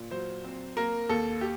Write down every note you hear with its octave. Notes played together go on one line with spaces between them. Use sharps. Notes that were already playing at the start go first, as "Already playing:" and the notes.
Already playing: A#2
F#3 C5
C4
A#3 A#4
D#2 A4
G4